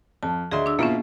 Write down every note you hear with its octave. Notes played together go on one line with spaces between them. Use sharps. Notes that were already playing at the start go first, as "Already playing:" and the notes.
F2 A5
D2 G#4 D#5 E5 C6
D4 E6
B2 A#3 B3 C#4 E4 F4